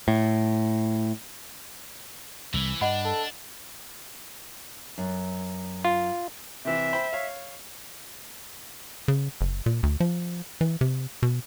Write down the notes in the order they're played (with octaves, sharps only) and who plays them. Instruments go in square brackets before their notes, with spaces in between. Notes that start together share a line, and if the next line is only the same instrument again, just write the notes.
[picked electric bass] A2
[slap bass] C2 [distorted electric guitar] E3
[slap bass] G2 [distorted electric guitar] D4 [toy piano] D#5 F#5 B5
[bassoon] A4
[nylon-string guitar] F#2
[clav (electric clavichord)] F4
[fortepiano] C3 E3 [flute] E5
[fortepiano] C5 G5 B5
C#5 F5
[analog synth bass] C#3
F#1
A#2
D2
F3
E3
C3
B2